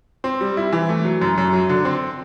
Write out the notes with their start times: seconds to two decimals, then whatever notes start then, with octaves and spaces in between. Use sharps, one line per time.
0.24 C4
0.41 G3
0.57 E4
0.73 E3
0.89 A3
1.05 F#3
1.22 F#2
1.38 F#2
1.53 F#3
1.69 D3
1.85 C4